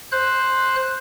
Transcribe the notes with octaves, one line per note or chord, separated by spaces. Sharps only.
C5 F#6